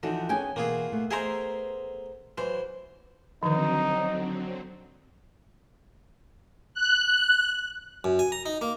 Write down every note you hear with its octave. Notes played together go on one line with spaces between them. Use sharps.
D3 E3 F3 D#4 F#4
B3 C#4 G#4 G5 G#5
B2 E3 A#3 F4 G#4
A3 B3
G#4 A#4 C5 D#5 E5 A#5
E3 F#3 C5
D3 D#3 F3 F#3 C4 D#4
F#6
F#2
G#5
A#5
D#4
A#3